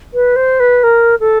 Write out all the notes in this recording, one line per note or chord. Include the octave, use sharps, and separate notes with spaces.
B4
C5
B4
A#4
A4